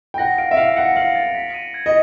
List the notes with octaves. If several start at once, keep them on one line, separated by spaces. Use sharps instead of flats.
G5
F#5 A#6
F5 D7
E5
F5 F7
F#5 C#7
F5 F#7
A6
B6
D#7
G#6
D#5